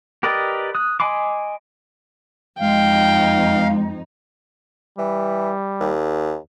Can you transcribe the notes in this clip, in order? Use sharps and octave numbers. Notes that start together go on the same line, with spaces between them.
G4 A#4 B4 D5 D#5
D#6 F#6
D#5 G#5 B5 C6 D6
F2 G#3 D#4 F5 G5
E3 G3
D#2